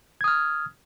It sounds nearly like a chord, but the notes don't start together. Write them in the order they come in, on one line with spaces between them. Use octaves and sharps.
G#6 D#6 F6